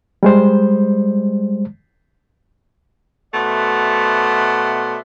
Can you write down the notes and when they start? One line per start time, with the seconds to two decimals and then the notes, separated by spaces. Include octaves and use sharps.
0.23 G3 G#3 C5
3.34 B2 A3 C5 D5 E5 F#5